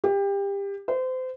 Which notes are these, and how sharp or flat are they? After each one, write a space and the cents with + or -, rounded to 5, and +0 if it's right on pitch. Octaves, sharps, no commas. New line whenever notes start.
G4 +25
C5 -30